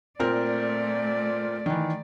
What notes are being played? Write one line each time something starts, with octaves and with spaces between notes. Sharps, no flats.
A#2 A3 C4 A#4 D5
D#3 E3